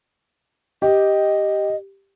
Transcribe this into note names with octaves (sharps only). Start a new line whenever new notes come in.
G4 D#5